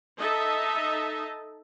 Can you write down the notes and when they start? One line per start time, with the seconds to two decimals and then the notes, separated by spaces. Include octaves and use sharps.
0.19 D#4 A4 D#5 E5 A5